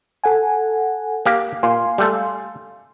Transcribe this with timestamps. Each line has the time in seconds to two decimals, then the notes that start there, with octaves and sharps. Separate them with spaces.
0.24 A4 F#5 G#5
1.26 A#3 G4 F5
1.63 A#2 F5 G#5 C6
1.98 G3 A3 A4